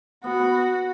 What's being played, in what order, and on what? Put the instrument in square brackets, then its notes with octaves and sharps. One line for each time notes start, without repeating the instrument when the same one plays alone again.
[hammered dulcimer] B3 [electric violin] F#4
[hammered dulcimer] B3